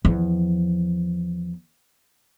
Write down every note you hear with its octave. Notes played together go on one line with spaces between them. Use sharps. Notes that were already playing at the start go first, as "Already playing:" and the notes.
E2 F3